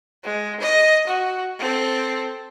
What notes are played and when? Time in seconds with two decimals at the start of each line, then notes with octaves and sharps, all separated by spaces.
0.24 G#3
0.60 D#5
1.07 F#4
1.59 C4 A4